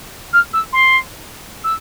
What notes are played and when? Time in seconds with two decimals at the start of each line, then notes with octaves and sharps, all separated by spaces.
0.33 F6
0.53 E6
0.72 C6
1.64 E6